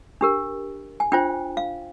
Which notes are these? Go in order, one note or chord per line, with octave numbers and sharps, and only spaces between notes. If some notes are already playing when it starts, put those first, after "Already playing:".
D4 G4 A#4
G#5
D4 F4 C5 G5
F5